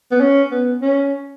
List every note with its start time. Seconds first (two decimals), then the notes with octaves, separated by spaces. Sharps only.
0.11 B3
0.20 C#4
0.51 B3
0.82 C#4